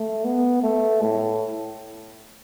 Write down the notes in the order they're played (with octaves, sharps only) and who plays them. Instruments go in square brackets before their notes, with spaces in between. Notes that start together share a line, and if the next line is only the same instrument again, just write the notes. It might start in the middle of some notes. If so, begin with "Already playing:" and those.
Already playing: [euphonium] A3
B3
A3
A2